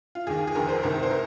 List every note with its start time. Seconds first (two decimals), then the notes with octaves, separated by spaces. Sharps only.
0.15 F4
0.27 D#2 D#3 G#4
0.47 G#4
0.55 F1 F2 D#3 A#4
0.69 C5
0.83 C2 C3 D#3 A#4
1.03 C5
1.11 A#4